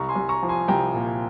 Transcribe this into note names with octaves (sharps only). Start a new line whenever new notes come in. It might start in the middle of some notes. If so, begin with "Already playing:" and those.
Already playing: C2 A#5 C#6
G#5 C6
C2
A#5 C#6
F3
G#5 C6
C2 G5 A#5
A#2